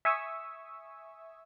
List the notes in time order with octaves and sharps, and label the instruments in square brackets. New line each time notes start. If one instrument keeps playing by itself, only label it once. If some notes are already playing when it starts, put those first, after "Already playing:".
[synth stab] E5 G#5 C#6 D#6 E6